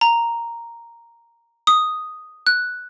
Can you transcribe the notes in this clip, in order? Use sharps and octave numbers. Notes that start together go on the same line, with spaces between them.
A#5
D#6
F#6